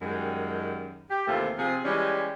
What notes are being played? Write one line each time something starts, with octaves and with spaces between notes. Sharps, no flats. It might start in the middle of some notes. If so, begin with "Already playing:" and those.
F#2 D#3 G3 G#3
G4
D#2 C3 E3 A3 F4
C3 F3 F4 G#4
E3 G3 G#3 C#4 G4